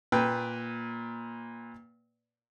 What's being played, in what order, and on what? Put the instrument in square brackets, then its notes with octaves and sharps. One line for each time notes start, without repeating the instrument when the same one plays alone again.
[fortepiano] A#2 B4 G5